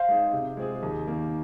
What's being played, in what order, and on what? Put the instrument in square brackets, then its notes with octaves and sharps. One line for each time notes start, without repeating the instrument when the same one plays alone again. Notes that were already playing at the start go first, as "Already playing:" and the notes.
Already playing: [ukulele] C5 F5
[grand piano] G#3 D#4 G#4
C3
G#3 C4 F4 G#4
D#2
D#3 A#3